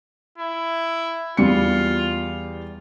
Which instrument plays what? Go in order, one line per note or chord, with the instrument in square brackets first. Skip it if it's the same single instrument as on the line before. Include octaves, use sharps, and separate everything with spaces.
[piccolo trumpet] E4
[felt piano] E2 G3 C#7 [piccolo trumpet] F4